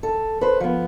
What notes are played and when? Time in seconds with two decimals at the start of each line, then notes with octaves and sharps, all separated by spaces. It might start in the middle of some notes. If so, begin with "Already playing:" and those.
0.03 A4
0.41 B4 C5
0.60 F3 B3